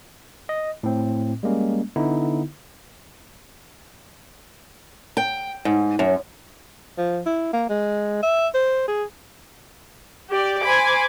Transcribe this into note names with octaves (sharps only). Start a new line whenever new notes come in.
D#5
A2 C4
G3 G#3 A#3 C#4
D3 B3 D#4 E4
G5
G#2
F#2
F3
E4
A#3
G#3
E5
C5
G#4
G4 D5
C5 G#5 B5 D6